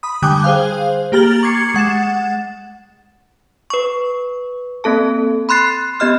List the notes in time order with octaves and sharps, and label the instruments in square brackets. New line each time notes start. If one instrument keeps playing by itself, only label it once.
[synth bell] B5 D#6
D3 G3 G5 G#5 D#6 F#6
G#4 C5 F5
A#3 G4 A#5 F6 A6 F#7
C#6 D6 G#6 C7 C#7
G#3 F#5 A6 E7
[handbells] B4 C#6
A#3 C4 A4 A5
B5 C6 F#6 A6 C7
B3 G4 D#5 F6 F#6